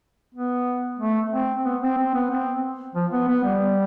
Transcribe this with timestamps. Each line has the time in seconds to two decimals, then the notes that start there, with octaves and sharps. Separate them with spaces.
0.35 B3
0.99 A3
1.32 C4
1.65 B3
1.82 C4
1.98 C4
2.14 B3
2.31 C4
2.95 F3
3.12 B3
3.28 B3
3.44 G3